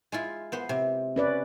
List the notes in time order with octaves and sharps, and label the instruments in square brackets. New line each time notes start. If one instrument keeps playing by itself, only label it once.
[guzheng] G#3 E4 F4
B3 C5
C3
[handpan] C#4 B4 D5